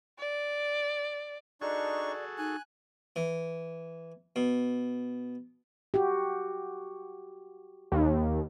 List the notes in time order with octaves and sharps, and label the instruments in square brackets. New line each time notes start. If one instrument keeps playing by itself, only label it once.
[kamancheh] D5
[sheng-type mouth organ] D4 D#4 C#6 [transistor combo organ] F#4 G#4 A4 [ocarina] D5
[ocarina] D#4 [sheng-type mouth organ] G#5 F#6
[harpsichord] E3
B2
[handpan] F#4 G4
[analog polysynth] D#2